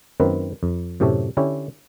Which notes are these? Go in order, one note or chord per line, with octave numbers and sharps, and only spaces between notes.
F#2 D#3 A#3 C4 B4
F2
F#2 A2 C3 G4 A4 C#5
D3 C#4 E4 G4 C#5